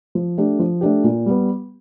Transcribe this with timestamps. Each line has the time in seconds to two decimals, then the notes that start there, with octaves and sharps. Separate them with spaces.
0.15 F3
0.38 A3 D4 G4
0.59 F3
0.81 A3 D4 G4
1.04 A#2
1.26 G3 B3